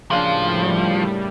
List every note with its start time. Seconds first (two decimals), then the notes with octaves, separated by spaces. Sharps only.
0.11 A2 C#3 F3 G3 A#3 D4